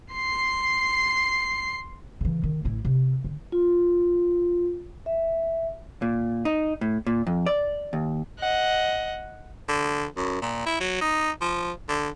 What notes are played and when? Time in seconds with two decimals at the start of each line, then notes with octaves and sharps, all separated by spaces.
0.14 C6 C7
2.21 C#3 E3
2.43 D#3
2.65 A1 E4
2.85 C3
3.24 D3
3.52 F4
5.06 E5
6.02 A#2
6.45 D#4
6.81 A2
7.07 A#2
7.27 F2
7.46 D5
7.93 D#2
8.39 D#5 F#5
9.68 D3
10.17 F#2
10.42 A#2
10.66 E4
10.80 F#3
11.01 D#4
11.42 F3
11.89 D3